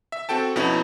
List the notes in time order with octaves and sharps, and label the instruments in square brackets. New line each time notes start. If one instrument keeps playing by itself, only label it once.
[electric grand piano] E5
C4 F#4 A4 G5 A5
F2 B2 B3 C#4 D#4 E4